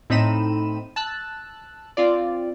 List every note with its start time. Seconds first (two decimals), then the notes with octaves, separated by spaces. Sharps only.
0.10 A2 C4 D#4 B5 D#7 E7
0.96 A5 E6 F#6
1.97 C4 F4 D5